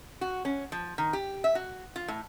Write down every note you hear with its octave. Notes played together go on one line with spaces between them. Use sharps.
F#4
C#4
F3
D#3
G4
E5
F#4
F4
A2